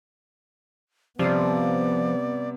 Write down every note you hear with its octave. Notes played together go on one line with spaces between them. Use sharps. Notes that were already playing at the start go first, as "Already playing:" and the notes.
C3 F3 G3 B3 D5